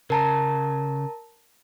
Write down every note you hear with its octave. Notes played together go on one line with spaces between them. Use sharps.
C#3 A#4 A5 A#5